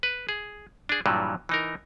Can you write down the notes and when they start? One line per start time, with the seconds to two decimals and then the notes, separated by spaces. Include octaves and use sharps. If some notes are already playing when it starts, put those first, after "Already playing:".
0.03 B4
0.29 G#4
0.89 D4 G#4
1.06 G2 A#2 E3 F#3 G3
1.49 E3 D#4 A#4